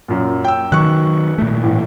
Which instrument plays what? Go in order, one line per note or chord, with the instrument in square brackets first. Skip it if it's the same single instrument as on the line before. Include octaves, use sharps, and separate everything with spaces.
[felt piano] F#2 A#2
G5 E6
[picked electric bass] D#3 F#3 [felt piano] C#6 F#6
[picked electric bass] A#2 A3
[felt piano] A1 A2